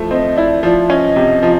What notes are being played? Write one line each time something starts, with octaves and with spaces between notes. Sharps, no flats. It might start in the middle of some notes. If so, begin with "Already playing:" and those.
Already playing: F3 A3 E4
C4 D#5
E4 D5
F3 D5
C#4 D#5
C3
F3